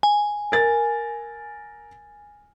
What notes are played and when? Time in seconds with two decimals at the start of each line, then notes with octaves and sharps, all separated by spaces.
0.03 G#5
0.52 A#4 A6